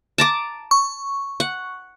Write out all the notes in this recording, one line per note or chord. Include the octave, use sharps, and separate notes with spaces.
A5 A#5 D6
C#6
F#5